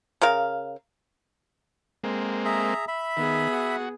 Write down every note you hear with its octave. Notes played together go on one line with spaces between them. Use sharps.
C#3 A#4 F5
G#3 A#3 C4
G#4 E5 A#5
E5 B5
D#3 B3 G#4
F#4